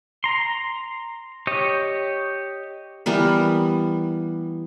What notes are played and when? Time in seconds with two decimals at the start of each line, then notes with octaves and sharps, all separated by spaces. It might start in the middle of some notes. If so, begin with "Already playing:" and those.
0.24 A#5 C6
1.47 G4 C#5 D#5
3.06 E3 G3 B3 A#4